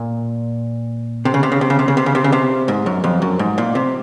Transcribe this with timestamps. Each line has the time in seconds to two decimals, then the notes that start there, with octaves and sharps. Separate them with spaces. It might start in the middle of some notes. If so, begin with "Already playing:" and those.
Already playing: A#2
1.25 C3
1.34 C#3
1.43 C3
1.52 C#3
1.61 C3
1.70 C#3
1.79 C3
1.88 C#3
1.97 C3
2.06 C#3
2.15 C3
2.24 C#3
2.32 C3
2.68 G#2
2.86 F#2
3.04 F2
3.22 F#2
3.39 G#2
3.58 A#2
3.75 C3